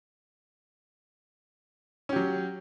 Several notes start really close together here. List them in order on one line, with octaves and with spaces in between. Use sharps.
C#4 G4 F#3